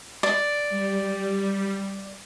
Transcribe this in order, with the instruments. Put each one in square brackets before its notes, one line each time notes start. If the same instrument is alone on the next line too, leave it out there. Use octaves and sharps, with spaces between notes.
[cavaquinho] D5
[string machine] G3